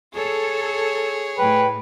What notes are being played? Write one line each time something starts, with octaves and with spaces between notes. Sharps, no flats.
G#4 A4 C#5
A2 B4 G5